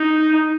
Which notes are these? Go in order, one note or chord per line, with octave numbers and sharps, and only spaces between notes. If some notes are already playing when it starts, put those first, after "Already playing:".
Already playing: D#4